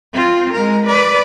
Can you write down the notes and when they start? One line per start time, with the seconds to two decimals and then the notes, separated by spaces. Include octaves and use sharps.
0.13 C4 F4
0.53 G#3 A#4
0.86 B4 D5